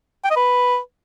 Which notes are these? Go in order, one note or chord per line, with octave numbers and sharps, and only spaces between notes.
G5
D#5
B4